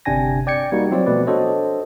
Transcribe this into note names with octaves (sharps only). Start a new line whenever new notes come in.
G1 C3 D4 G5 G#5 A#6
D5 G5 G#6 C#7
G3 A#3 D#4 F#4
F#3 C4 F4 C#5 D5
B2 F3 A3 B4 D5
D4 F#4 A4 C5 C#5 D#5